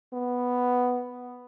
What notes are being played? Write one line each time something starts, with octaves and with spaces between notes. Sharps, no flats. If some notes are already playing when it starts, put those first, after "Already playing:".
B3